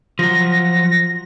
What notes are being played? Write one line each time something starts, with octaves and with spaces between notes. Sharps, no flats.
F3 F#3 A#6